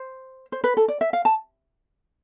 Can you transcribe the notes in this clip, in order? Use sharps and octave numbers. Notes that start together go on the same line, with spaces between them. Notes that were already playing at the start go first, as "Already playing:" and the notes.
Already playing: C5
C5
B4
A4
D5
E5
F5
A5